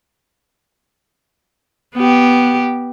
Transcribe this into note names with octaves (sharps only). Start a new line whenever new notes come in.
B3 G4